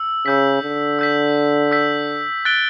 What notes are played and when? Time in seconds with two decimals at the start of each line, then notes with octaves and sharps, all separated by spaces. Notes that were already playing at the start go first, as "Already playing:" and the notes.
Already playing: E6
0.26 C#3 E6 G6 B6
0.62 D3
0.99 E6 G6 B6
1.71 E6 G6 B6
2.45 F#6 A6 D7 G7